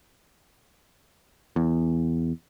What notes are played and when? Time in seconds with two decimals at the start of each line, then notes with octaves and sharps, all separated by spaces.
1.56 E2